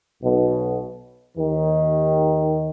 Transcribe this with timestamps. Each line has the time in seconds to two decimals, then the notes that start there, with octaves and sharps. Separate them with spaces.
0.22 B1 B2
1.37 D#2 D#3